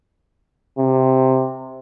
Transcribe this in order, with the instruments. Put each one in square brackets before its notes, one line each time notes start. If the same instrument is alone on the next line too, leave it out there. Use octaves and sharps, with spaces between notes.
[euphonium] C3